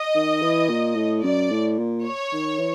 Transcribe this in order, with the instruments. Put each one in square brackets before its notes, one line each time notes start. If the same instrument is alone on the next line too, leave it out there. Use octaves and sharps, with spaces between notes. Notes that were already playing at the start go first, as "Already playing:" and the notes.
Already playing: [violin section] D#5
[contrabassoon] D#3
E3
A#2
A2
[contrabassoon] F#2 [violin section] D5
[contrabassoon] A2
A#2
[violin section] C#5
[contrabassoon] D#3
E3